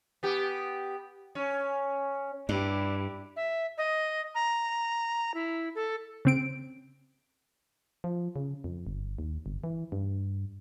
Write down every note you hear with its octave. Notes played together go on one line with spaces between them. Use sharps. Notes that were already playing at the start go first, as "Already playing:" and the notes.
B3 G4
C#4
G2 D4 E4 G4
E5
D#5
A#5
E4
A4
C#3 C4 D7
F3
C#3
F2
G1
D#2
G1
E3
G2